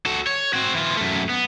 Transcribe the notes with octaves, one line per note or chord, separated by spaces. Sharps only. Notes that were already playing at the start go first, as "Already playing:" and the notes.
F#4 A4
C#5
C4 F#4
E3 F4
F#2 A3
B3